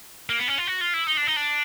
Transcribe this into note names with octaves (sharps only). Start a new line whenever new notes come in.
A#3
B3
C#4
F4
F#4
F4
E4
D#4
D4
D#4
D4